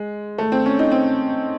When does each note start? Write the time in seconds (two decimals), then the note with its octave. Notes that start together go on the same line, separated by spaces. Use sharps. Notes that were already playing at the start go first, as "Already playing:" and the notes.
Already playing: G#3
0.38 A3
0.52 C4
0.66 C#4
0.79 D#4
0.91 C4